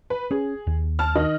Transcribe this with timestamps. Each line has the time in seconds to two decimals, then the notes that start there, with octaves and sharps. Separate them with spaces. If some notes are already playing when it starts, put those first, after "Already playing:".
0.10 B4
0.31 C#4 G#4
0.67 D#2
0.99 A5 F6
1.15 D#3 D#5